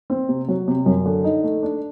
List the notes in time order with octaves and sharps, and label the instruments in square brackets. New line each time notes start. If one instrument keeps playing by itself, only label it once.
[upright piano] C4
C3
F#3
C3
F#2
D3
D#4
A3
D4